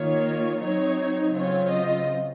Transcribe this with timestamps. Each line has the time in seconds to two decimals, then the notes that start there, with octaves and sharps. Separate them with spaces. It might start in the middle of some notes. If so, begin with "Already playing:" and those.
Already playing: D#3 A#3 F4 C#5
0.59 F#3 C4 D#4 C#5
1.33 C#3 F#3 C4 F4 C#5
1.71 D#5